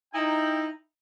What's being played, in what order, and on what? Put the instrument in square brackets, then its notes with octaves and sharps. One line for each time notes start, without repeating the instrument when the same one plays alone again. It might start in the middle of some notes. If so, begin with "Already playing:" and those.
[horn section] D#4 E4 G5